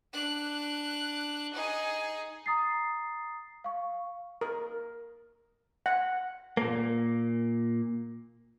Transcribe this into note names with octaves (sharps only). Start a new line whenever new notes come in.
D4 F#6
D#4 G#4
A#5 D#6 A6 C7
F5 C#6
A#4
F#5
A#2 A#3